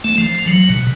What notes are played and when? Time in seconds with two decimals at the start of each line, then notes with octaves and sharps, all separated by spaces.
0.04 A3
0.18 F3
0.48 F#3
0.70 B2